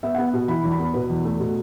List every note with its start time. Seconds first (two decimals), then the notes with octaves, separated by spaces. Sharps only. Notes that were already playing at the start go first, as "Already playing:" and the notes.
0.03 B3 E5
0.15 B3 F#5
0.33 B2
0.48 E3 B5
0.64 E2
0.71 B5
0.79 B3
0.94 B2 B4
1.09 E2
1.25 A3
1.40 B2